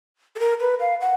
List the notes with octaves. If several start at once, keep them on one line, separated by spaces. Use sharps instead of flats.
A4
A#4
B4
F5
F#5